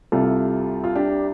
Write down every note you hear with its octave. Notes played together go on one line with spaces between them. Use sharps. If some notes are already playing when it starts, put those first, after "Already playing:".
C2 C3 F4 A4
F4
D4 G4